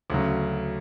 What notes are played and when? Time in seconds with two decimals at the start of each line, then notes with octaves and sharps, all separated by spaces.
0.10 D2 C#3 F#3